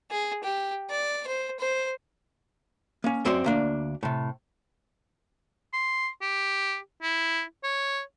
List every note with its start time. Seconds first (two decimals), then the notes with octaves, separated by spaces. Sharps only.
0.11 G#4
0.44 G4
0.90 D5
1.27 C5
1.59 C5
3.04 A#3 C#4
3.25 F#2 C4 F#4 D5 C6
3.44 D2 A#3 D4
4.03 A2 C3
5.73 C6
6.22 G4
7.02 E4
7.63 C#5